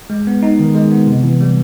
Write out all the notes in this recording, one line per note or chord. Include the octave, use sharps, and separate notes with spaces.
G#3
B3
D#4
D#3
G#3
B3
C3
E3
G3